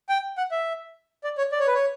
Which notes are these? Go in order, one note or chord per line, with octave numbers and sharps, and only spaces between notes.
G5
F#5
E5
D5
C#5
D5
C#5
B4
C#5